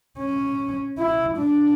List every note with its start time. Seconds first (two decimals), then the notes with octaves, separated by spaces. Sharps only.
0.19 C#4
0.98 E4
1.38 D4